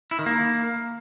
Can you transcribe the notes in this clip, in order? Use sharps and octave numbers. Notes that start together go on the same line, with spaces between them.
E4
D#3
A#3